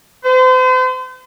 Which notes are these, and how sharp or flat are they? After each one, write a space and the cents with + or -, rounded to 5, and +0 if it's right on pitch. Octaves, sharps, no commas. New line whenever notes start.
C5 -40